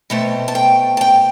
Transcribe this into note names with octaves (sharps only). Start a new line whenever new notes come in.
B2 A3 C4 E5
A5
G5
A5
G5